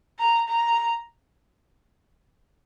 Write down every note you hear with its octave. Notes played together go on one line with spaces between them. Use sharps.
A#5
A#5